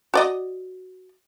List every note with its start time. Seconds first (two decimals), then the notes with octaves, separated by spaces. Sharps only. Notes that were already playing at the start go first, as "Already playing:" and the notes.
0.14 F#4 D5 D#5